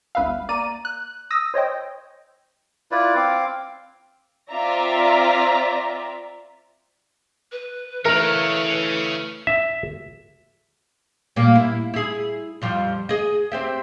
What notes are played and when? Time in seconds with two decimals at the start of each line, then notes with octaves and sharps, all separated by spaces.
0.15 G1 C#2 B4 E5 F5
0.49 A#3 D5 A#5 D#7
0.85 F#6
1.31 D#6 E6 A#6
1.54 C5 C#5 D#5 G5
2.91 E4 F4 B4 D5
3.15 C4 F5 D6
4.51 C4 F4 D5 E5 A#5
7.52 B4
8.05 E3 A3 A#4 C#5 F5
9.47 E5
11.36 A#2 G3 A#3
11.55 E4
11.94 E4 G#4
12.62 F2 F3 G3
13.09 G#4 D#5
13.52 C4 G4 E5